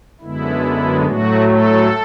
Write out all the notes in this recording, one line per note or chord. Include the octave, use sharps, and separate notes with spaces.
F#2 D3 G#3 B3 E4
A2 F#3 A3 F#4
A4